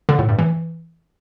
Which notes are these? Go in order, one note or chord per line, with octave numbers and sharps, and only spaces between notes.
D3
A2
G2
E3